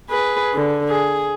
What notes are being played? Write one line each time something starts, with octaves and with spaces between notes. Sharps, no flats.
G#4 B4
D3
G#4